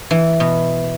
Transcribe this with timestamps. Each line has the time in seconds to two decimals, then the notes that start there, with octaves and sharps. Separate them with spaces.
0.11 E3
0.40 B2